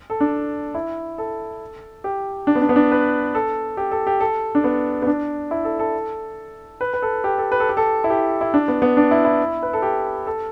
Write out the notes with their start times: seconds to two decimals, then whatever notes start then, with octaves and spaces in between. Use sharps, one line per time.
0.10 A4
0.20 D4
0.75 E4
1.18 A4
2.04 G4
2.47 D4
2.55 B3
2.62 D4
2.69 B3
2.76 D4
2.92 B4
3.35 A4
3.77 G4
3.91 A4
4.07 G4
4.20 A4
4.55 D4
4.64 B3
5.02 B3
5.07 D4
5.51 E4
5.65 A4
5.79 A4
6.81 B4
6.94 B4
7.02 A4
7.24 G4
7.38 A4
7.52 B4
7.60 A4
7.69 G4
7.77 A4
8.04 E4
8.10 G4
8.41 E4
8.54 D4
8.68 B3
8.82 B3
8.97 D4
9.11 E4
9.25 E4
9.63 B4
9.73 A4
9.82 G4
10.27 A4